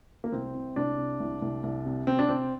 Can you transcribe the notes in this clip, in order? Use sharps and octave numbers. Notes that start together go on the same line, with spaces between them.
A#3
C2 C4
C3
C2 D4
C3
C2
C2
C2
C3
C3 C4
D4
C3 C4